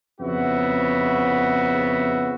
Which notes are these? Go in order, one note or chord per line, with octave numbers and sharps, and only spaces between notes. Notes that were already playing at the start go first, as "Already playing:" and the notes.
F2 C#3 B3 F#4 E5